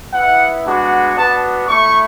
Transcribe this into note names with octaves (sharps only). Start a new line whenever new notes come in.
B3 E4 F#5
G#3 B3 D4 F#4
B3 D4 F#4 A5
A3 E4 C#6